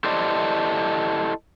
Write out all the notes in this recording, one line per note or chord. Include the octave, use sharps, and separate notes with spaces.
E4 G4 A4 C5 D5 D#5